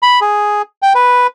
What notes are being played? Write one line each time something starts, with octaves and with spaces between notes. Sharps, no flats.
B5
G#4
G5
B4